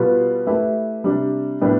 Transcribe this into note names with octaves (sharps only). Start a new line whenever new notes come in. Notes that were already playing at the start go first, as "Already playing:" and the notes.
Already playing: B2 G3 B3 F4 B4
A3 E4 G4 B4
C3 G3 D4
A2 G3 B3 D4 G4